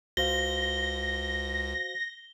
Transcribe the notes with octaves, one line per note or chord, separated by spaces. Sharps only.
C#2 F#4 C5 F5 A#6 G7